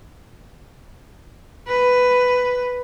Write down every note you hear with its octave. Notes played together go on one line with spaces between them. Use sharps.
B4